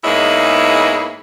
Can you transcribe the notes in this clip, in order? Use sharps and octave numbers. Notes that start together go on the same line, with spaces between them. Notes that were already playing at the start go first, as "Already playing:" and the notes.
E2 G#2 A#3 E4 C#5 D#5